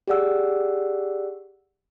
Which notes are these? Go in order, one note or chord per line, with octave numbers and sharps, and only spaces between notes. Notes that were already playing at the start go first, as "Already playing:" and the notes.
G4 G#4 D5 F#5 E6